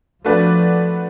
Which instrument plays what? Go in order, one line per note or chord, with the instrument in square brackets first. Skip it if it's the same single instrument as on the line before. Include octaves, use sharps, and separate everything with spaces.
[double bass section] F3 [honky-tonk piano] A3 D4 F#4 B4 D5